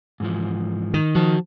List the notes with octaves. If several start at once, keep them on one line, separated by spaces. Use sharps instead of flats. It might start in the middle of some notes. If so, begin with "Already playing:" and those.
G#2 E3 F3
D#3
F3 F#4 A5